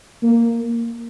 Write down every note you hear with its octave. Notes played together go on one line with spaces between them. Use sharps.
A#3